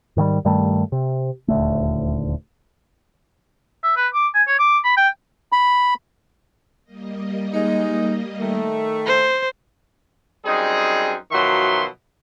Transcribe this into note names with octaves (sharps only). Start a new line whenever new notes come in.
G#2 D#3 F3 G3
G2 D#3 G3 A3
C3
D#1 D2 A3
E5
B4
D6
G#5
C#5
D6
B5
G5
B5
G3 A#3 D#5
G#3 D#4
D#3 A3
C5
F#2 G3 C4 D#4 G#4
B2 D#3 F3 F#3 E5 C6